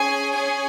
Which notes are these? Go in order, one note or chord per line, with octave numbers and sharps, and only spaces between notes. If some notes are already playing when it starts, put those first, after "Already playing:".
Already playing: C#4 G#4 G#5
C#4 G#4 G#5